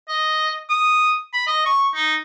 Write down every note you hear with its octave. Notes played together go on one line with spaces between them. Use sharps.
D#5
D#6
B5
D#5
C#6
D#4